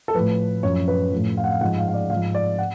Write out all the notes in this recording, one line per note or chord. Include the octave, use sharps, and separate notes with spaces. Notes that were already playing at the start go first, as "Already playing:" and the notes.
A4
A2 F3 B4
F#2 F3 C#5
B4
A2 F3
F5
F#5
F5
G#2 F3 F#5
F5
F5
D5
G#2 F3 F5
D5
F#5